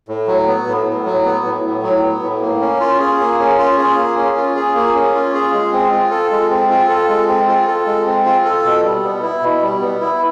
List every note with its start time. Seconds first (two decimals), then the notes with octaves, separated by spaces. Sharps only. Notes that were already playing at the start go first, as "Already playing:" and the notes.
0.08 A2
0.27 F#3
0.48 B3
0.67 A2
0.87 A2
1.06 F#3
1.25 B3
1.45 A2
1.64 A2
1.83 F#3
2.03 B3
2.22 A2
2.42 A#3
2.61 C#4
2.81 F4
3.00 G#4
3.20 A#3
3.39 C#4
3.58 F4
3.78 G#4
3.97 A#3
4.17 C#4
4.37 F4
4.56 G#4
4.75 A#3
4.95 C#4
5.14 F4
5.34 G#4
5.53 G#3
5.73 C4
5.92 F4
6.11 A4
6.31 G#3
6.50 C4
6.70 F4
6.89 A4
7.09 G#3
7.28 C4
7.48 F4
7.67 A4
7.87 G#3
8.06 C4
8.25 F4
8.45 A4
8.65 B2
8.84 G3
9.03 B3
9.22 E4
9.42 B2
9.62 G3
9.81 B3
10.01 E4